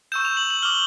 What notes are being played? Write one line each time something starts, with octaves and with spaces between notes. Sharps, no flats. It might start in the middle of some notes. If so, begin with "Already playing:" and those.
C#6 E6 G6 E7
F7
F#7
F#7
D6 F6 G7